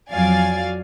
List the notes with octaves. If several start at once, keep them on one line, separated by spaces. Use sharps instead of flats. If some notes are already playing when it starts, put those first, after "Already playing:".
F2 F#3 D5 F5 G#5 A6